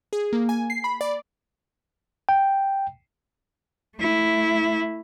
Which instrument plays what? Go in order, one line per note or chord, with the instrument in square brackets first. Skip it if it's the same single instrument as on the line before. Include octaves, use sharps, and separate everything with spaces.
[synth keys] G#4
A#3
G#5
C7
B5
D5
[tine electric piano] G5
[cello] A3 E4